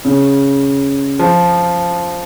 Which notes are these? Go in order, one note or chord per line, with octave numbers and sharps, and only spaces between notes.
C#3
F3